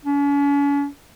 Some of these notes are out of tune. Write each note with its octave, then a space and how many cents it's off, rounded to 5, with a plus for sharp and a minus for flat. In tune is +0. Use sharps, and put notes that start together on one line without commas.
C#4 +40